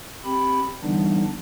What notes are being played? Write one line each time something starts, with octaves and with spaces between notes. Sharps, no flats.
C4 G4 B5
D3 E3 G3 B3 D4 D#4